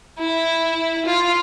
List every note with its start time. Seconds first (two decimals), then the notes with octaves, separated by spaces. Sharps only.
0.19 E4
1.06 F4